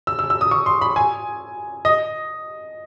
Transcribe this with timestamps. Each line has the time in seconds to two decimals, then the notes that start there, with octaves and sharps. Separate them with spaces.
0.07 E6
0.19 E6
0.30 E6
0.41 D#6
0.51 C#6
0.66 C6
0.81 B5
0.96 G#5
1.85 D#5